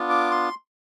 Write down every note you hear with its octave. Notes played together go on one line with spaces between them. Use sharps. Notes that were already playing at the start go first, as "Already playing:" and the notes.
Already playing: B3 D4 F4
D6
C6